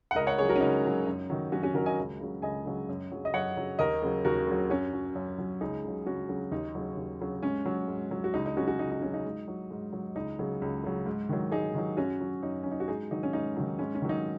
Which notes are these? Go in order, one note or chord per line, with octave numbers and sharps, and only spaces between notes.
F#5
C#2 A#4 D#5
C#5 F#5
C#3 G#4 C#5
F#3
F#4 A#4
C#4
C#2 D#4
C#3 F#3
F#2
D#3 F#3
F#2 C#4 F#4
C#4 F#4
D#3 F#3 F#4 A#4
D#5 G#5
C#2
C#3 F#3
C#2 D#5 G#5
C#3 F#3
F#2
C#3 F#3
D#5
F#2 C#5 F#5
C#3 F#3
D#2 A#4 D#5
C#3 F#3
D#2 F#4 A#4
C#3 F#3
F#2 C#4 F#4
F#3
F#2
F#3
C#2 D#4 G#4
C#3 F#3
C#2 C#4 F#4
C#3 F#3
D#2 D#4
C#3 F#3
D#2
C#3 F#3
G#2 C#4
F#3
G#2
F#3
F#4
C#2 D#4
D#4
C#3 F#3 C#4 F#4
C#4 F#4
C#2 D#4
D#4
C#3 F#3 C#4
D#4
G#2
F#3
G#2
F#3
C#2 D#4
C#3 F#3
C#2
C#3 F#3
G#2
D#3 F#3
G#2 D#4 G#4
D#3 F#3
F#2 C#4 F#4
F#3
F#2 D#4
F#3 C#4
D#4
F#4
G#2 D#4 G#4
D#3 F#3 D#4
C#4
G#2 D#4
D#3 F#3
G#2 C#4
C#4
D#3 F#3
D#4